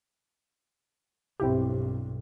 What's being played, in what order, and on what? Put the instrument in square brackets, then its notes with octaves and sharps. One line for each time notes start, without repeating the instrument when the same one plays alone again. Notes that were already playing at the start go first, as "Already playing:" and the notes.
[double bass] B1 G2 [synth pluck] C4 E4 G4